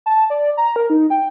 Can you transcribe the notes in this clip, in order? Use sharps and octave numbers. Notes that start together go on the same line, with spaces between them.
A5
D5
A#5
A#4
D#4
G5